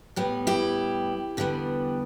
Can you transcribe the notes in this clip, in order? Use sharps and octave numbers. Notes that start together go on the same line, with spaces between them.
A2 G3 B3
E4 G4
E2 D3 G3 B3